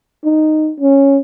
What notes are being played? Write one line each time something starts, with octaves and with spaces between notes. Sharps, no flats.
D#4
C#4